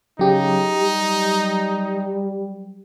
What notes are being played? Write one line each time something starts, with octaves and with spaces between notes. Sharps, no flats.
C#3 F#3 D#4 G4
G3